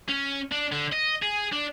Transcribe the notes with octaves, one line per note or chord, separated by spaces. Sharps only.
C#4
D4
D3
D#5
G#4
D4